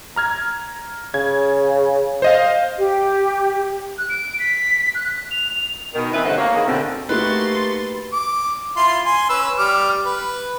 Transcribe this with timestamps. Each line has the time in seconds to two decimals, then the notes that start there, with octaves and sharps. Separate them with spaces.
0.16 A#5 F6 G#6
1.14 C#3 G#6
2.22 C5 D#5 F5
2.78 G4
3.98 F#6
4.09 D7
4.39 B6
4.95 F#6
5.31 F7
5.95 B2 D#3
6.13 E3 C4 D#4 B4 E5
6.25 G2 D3 A3 C5 D#5 F#5
6.37 A#3 C#5
6.55 D#3 B3 G#4
6.67 B2 D3 A3 C4
7.09 A3 A#3 D#4 F#4 G4 B4 C6 A6
8.13 D6
8.77 E4 F4 C6
9.06 G#5 C6
9.30 C#4 B4 E6
9.58 G3 D6 F6
10.06 B4